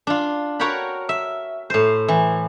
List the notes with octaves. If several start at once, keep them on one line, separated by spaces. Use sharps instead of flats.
D4 F4
F#4 A#4 C#5 F#5 G5 B5
E5
A2 C5
E3